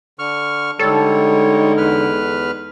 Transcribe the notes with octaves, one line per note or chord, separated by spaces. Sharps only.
D3 C#6 F6
D3 G3 G#3 D#4 A4 C#5
E2 B4 F6